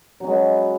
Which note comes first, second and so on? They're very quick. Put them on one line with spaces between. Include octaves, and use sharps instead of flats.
F#3 C#4 G#3 B4